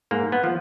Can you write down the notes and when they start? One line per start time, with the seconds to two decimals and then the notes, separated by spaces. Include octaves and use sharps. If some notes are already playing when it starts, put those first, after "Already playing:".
0.11 G#2 A#3
0.32 B3
0.44 F3